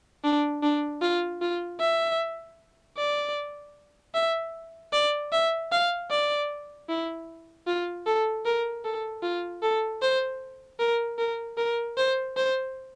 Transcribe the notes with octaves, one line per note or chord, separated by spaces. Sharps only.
D4
D4
F4
F4
E5
D5
E5
D5
E5
F5
D5
E4
F4
A4
A#4
A4
F4
A4
C5
A#4
A#4
A#4
C5
C5